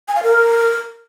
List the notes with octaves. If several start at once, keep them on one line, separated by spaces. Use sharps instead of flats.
G#5
F5
A#4